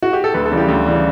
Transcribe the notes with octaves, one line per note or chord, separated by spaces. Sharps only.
F#4
G4
A4
D2 B4
A4
C#3 E3 G3
G4
D2
C#3 E3 G3